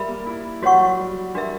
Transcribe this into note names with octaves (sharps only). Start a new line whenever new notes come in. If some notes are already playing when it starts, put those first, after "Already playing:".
Already playing: G3 A#4 E5 B5
A#3
E4
G3 F#4 C#5 F#5 C#6
F#3
G3
G3 D4 F#4 A#4 E5